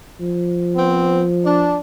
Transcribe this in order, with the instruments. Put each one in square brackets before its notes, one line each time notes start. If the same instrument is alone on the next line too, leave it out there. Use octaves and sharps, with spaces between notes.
[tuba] F3
[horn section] B3 C4
D4